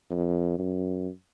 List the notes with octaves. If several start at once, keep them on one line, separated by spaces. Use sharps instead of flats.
F2
F#2